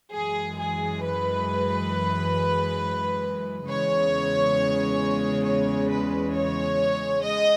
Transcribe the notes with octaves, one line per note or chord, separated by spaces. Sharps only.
F#2 E3 G#3 G#4
G#4
B4
E2 C#3 G#3 C#5
C#5
B4
C#5
G#3 D#5